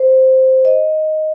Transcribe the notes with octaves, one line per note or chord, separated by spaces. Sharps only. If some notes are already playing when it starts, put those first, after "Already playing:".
Already playing: C5
D#5